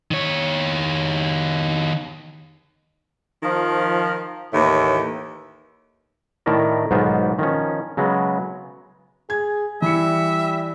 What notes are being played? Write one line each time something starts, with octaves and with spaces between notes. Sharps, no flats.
D#3 C#5
D#3 F3
D#2 A2 E3
A2 D#3 E4 A4 A#4 D5
B1 G#2 D#3 B3 F4 C5
D#3 F3 C#4
C#3 F#3 G#3 B3
G#4 G#6
E3 G3 E5 B5 C#7